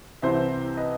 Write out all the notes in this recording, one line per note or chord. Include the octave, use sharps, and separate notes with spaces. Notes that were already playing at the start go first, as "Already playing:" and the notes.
C2 C3 E3 C5 E5
B4 D#5